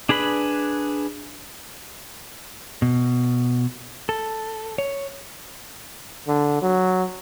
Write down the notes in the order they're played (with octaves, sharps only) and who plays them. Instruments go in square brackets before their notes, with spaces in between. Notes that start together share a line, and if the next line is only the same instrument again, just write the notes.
[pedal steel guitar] D4 G#4 B4 B5
[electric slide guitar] B2
A4
C#5
[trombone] D3
F#3